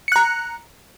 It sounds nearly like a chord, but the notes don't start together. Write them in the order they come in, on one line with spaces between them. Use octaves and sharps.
C#7 F#6 A#5